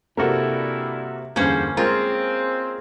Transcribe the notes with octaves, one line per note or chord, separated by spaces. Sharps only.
G2 C3 A#3 E4 F#4 A4 A#4
E2 G2 D3 F3 A#3 C#4 C5
G#3 C4 F4 G#4 A#4